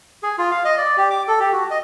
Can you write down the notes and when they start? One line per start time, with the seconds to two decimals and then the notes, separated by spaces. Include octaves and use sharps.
0.23 G#4
0.38 F4
0.51 F5
0.65 D#5
0.78 D5
0.97 G4
1.10 D6
1.28 A4
1.40 G4
1.52 F#4
1.71 D#5